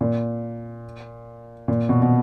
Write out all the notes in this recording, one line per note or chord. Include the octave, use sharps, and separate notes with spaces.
A#2
A#2
B2
B2